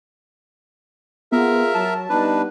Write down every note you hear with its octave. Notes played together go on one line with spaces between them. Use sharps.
B3 F4 G#4 A#4 E5
F#3 A5
G3 B3 D4 D#4 B4